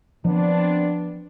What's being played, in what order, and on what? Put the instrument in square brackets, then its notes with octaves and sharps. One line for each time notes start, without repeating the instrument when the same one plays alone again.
[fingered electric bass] F3 [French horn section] B3 C4 D4